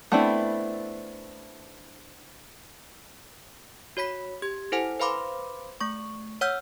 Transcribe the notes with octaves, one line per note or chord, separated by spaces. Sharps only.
A3 B3 C4 D4 E4
F#4 C#5 B5 B6
G4 G#6
E4 A4 C5 F#5 G#5
B4 C5 F5 B5 C6 D6
A3 C#6
C#5 F#5 E6 F6 G6